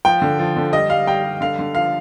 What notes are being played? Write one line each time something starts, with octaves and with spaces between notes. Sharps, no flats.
F3 G5
D3
F3
D3
G3 D#5
G3 F5
G3 G5
G3
D3 F5
D3
F3 F5